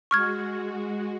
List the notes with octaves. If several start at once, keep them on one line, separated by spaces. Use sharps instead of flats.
G#3 F#4 C#6 F6 G#6